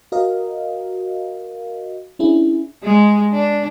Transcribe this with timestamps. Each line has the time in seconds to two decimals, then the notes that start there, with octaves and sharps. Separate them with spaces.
0.12 F#4 A#4 D#5 F5
2.19 C#4 D4 E4 G#4
2.83 G#3
3.32 D4